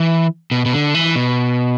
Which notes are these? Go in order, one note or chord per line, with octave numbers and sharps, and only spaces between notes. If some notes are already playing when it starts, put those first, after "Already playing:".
Already playing: E3
B2
B2
D3
E3
B2